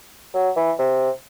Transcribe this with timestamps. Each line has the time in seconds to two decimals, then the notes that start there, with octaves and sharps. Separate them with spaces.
0.34 F#3
0.56 E3
0.79 C3